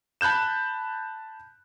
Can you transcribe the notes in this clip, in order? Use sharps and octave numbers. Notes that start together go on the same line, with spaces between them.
A5 B5 F#6 G6 E7